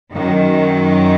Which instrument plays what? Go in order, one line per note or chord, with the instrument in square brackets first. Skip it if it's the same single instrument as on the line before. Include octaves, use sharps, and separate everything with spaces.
[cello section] F#2 D#3 F#3